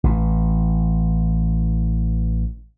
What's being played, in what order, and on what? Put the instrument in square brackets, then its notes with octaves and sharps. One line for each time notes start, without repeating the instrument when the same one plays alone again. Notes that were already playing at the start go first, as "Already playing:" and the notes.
[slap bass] A1 E3